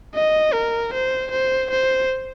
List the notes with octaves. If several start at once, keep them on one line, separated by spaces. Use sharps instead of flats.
D#5
A#4
C5
C5
C5